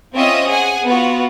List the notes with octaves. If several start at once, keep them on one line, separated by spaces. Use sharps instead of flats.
C4 C#4 F4 D#5 E5 D#6
G#4 F#5 G#5
B3 F4 F#4